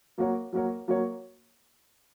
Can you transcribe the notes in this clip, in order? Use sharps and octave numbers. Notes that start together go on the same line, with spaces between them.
F#3 A#3 F#4 A#4 C#5
F#3 A#3 F#4 A#4 C#5
F#3 A#3 F#4 A#4 C#5